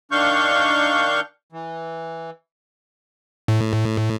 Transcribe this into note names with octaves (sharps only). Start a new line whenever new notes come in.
D#3 D4 F5 C#6 G6
E3
A2